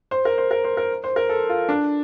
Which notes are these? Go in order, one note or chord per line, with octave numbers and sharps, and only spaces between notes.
C5
A#4
C5
A#4
C5
A#4
C5
A#4
A4
F4
D4